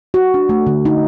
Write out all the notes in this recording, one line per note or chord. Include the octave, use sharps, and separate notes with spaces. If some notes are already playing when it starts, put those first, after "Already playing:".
F#4
D4
A3
D3
D#4